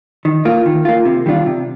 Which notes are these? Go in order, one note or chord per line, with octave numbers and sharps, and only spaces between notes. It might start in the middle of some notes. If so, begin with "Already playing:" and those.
D#3
A#3 F4
D#3
A#3 F4
C3
D#3 G3 D4 F4
C3